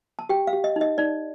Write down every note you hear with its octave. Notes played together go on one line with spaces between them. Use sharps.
A5
G4 G5
F5
G4
D#5
D#4 D#5
D#4 D5